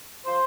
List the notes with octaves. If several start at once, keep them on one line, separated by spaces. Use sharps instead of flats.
F3 C5